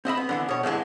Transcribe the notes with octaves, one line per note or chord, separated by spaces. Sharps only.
C4 D#5 E5 B5
B3
D3 E3 B3
B2 C#5
G2 D3 E3 G#3